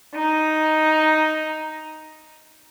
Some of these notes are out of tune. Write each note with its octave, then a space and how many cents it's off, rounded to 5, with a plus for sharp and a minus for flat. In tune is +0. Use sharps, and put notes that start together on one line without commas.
D#4 +0